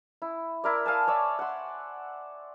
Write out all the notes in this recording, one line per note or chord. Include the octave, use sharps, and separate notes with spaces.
E4
E4 A#4 D5
F5 G#5 A5
C#5 D5 E5
F#5 C6